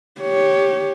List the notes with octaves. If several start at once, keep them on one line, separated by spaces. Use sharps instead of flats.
G4 C#5